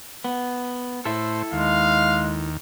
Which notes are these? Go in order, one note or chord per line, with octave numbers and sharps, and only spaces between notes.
B3
A2 E4 A4 C5
D#2 G#3 F5